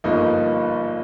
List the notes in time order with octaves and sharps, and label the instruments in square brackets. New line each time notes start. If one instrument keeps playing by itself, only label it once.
[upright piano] G1 G2 F3 A#3 D#4